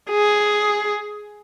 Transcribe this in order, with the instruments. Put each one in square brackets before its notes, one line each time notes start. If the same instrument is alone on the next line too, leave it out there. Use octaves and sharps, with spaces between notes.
[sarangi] G#4